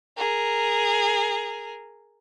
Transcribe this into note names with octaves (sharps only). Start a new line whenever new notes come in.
G#4 A#4